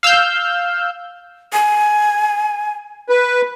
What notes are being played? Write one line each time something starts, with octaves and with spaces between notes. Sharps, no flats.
F5 E6 F6 G6
G#5
B4